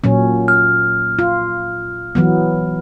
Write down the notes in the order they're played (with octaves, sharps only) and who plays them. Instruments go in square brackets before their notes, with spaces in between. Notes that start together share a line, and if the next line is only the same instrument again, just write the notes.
[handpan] A#2 F#3 C#4
[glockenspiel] F6
[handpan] F4
E3 F#3 B3